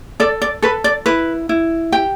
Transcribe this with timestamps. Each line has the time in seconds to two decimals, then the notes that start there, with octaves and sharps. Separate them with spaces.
0.20 A4 D5
0.42 D5
0.62 A4 B4
0.84 D5
1.06 E4 B4
1.49 E4
1.92 G4 G5